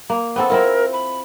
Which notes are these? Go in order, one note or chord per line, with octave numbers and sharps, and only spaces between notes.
A#3
B3 C4 A4
C4 E4 F4 A#4
B5